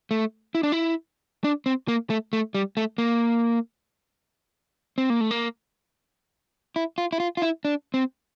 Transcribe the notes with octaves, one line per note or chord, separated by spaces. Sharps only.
A3
E4
D4
E4
D4
C4
A#3
A3
A3
G3
A3
A#3
C4
A#3
A3
A#3
E4
F4
E4
F4
F4
E4
D4
C4